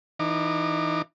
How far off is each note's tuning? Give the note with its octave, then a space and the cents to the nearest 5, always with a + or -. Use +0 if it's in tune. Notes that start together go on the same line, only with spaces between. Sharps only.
E3 -5 D#4 -20 D6 +10